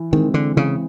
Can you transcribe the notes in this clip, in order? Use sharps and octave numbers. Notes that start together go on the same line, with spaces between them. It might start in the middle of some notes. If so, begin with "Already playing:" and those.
Already playing: E3
D#3 G#3 C4
D3
C#3 E3